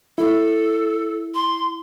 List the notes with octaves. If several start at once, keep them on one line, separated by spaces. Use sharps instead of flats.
E4 A4
C6